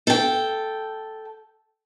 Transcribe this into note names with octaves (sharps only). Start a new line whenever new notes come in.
A4 G5